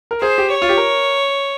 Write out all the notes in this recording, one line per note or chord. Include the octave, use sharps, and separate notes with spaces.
A#4
G#4 C5
G4
C#5
F4
G4
A#4